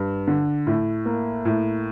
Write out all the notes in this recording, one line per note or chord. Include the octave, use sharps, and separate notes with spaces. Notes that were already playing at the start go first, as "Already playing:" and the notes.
Already playing: G2
D3
A2
A#3
A2